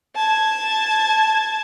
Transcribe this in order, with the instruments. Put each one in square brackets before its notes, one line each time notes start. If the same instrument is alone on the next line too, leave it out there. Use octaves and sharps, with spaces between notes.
[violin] A5 G#6